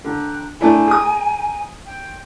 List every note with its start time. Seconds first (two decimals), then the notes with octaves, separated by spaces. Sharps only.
0.05 D3 G5 A#5 F#6
0.61 A3 D4 E4 G5 G#5 A#5
0.88 G#4 D#6
1.85 G5 C6